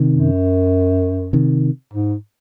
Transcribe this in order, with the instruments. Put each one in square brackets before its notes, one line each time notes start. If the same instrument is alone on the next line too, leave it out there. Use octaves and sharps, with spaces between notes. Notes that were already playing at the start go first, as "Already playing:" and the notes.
Already playing: [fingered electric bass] C3 D#3
[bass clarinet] F#2
[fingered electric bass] C3 D#3
[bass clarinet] G#2